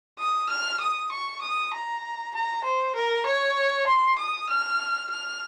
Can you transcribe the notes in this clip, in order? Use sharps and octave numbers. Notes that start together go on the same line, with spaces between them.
D#6
F6
D#6
C#6
D#6
A#5
A#5
C5
A#4
C#5
C6
D#6
F6
F6